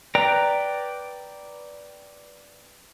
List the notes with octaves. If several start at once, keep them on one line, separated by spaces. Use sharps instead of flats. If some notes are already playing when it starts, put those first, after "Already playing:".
B4 D5 G5 A#5